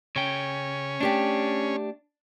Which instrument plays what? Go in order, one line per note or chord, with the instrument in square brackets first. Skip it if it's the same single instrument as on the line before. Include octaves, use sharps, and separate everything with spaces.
[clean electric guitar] C#3 G5 [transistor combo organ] C#4
[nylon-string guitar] A3 G4 G5 [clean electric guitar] D4